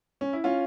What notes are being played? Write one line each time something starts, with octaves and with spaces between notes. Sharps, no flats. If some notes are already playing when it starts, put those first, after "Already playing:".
C#4
E4
C#4 F4